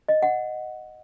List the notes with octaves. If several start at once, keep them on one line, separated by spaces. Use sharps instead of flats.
D#5
F#5